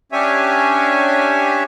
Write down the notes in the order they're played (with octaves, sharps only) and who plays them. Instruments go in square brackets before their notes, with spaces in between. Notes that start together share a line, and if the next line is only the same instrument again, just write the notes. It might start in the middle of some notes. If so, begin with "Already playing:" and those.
[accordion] C#4 D4 G4 C#5 E5 G#5